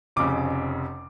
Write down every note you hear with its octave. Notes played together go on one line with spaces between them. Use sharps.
F1 F2 C#3 D6